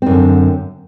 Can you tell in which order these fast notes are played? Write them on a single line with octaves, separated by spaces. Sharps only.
C4 F#2 D3